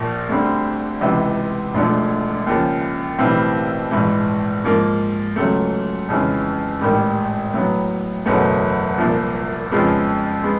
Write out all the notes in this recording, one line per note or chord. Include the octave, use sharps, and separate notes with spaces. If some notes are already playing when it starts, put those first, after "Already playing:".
Already playing: A#1 A#2 F3 A#3
D2 D3 G3 C4
C#2 C3 E3
E1 D2 D3 F3 A3
D#2 C#3 F3
B1 A2 E3 G3 C4
A#1 G#2 E3
G#2 F3 A#3
C#2 C#3 F#3 A3
F2 C#3 E3 G#3
A1 G#2 D#3 G3
A2 F#3 B3
F#1 E2 B2 F#3 A3
C2 A#2 F3
F2 C#3 F3 G#3 B3
G#3 B3